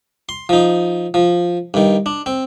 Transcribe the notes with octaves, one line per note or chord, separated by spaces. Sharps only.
C6
F3 D#4
F3
G2 D#3
D4
C4